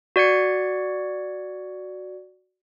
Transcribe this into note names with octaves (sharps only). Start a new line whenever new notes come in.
F#4 D5 G#6 C#7